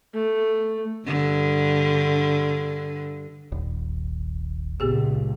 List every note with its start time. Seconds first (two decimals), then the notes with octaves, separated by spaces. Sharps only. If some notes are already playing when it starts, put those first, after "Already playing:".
0.14 A3
1.07 G2 D3
3.52 D#1 G#1
4.80 C#2 A#2 B3 G4 G#4